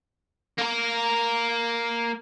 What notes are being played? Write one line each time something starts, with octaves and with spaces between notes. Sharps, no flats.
A#3 A#4